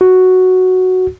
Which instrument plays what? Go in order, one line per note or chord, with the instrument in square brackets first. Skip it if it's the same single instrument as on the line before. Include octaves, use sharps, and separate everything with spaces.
[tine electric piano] F#4